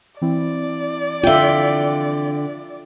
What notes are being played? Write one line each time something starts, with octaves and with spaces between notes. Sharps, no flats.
E3 C4 E4 D5
D3 F4 E5 G5